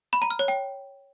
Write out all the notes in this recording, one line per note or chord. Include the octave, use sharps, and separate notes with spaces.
B5
A#5
F6
C#5
G5